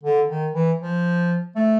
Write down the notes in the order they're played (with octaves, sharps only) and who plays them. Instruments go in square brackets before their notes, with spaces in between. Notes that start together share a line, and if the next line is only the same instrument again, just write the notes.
[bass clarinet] D3
D#3
E3
F3
A3